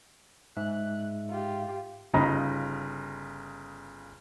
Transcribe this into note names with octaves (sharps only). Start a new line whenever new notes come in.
G#2 E5 F#6
F4 G4
G1 C#3 D#4 D#5 A#5 B5